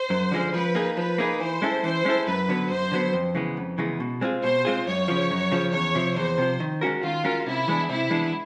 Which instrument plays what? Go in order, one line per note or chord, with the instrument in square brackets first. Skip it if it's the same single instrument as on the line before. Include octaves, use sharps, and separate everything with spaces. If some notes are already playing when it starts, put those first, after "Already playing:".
Already playing: [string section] C5
[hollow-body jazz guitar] F#2
D3 F3 G#3 C#4
[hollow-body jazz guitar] F3 [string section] B4
[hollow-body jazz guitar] A#3 D#4 G#4
[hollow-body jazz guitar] F3 [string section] B4
[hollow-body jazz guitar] A#3 D#4 G#4
[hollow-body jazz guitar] E3 [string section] C5
[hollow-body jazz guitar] G#3 C#4 E4 A4
[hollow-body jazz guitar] E3 [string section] C5
[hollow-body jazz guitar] G#3 C#4 E4 A4
[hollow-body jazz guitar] F#2 [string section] B4
[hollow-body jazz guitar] D3 F#3 B3
[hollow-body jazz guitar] F#2 [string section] C5
[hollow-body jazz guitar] D3 F#3 B3
F2
C#3 E3 G#3 B3
F2
C#3 E3 G#3 B3
B2
G#3 C4 F4 G#4
[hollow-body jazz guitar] B2 [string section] C5
[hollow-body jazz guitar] G#3 C4 F4 G#4
[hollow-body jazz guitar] F#2 [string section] C#5
[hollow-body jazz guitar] C#3 F3
F#2
C#3 F3
[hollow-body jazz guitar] E2 [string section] C#5
[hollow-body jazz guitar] C3 F3
[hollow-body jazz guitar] E2 [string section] C5
[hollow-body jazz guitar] C3 F3
D#3
G#3 C#4 F#4 A#4
[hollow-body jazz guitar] D#3 [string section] F4
[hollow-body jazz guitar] G#3 C#4 F#4 A#4
[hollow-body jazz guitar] C3 [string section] E4
[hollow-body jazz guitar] E3 G#3 B3 D4
[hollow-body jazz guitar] C3 [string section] E4
[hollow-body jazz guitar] E3 G#3 B3 D4